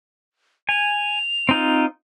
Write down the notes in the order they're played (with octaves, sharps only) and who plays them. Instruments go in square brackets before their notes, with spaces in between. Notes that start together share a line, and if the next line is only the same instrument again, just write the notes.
[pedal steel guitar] G#5 [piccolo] F7
[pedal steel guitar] C4 D#4 F4